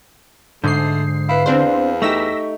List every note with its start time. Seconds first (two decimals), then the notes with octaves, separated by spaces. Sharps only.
0.64 G#2 D3 A3 D#6 G6 C7
1.29 E4 B4 F5
1.46 E2 C4 D4 C5
1.61 F5
2.02 A3 D#4 G4 C#6 E6 A#6 B6